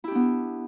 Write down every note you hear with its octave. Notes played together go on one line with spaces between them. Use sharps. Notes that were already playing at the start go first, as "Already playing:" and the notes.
B3 D4 E4 G4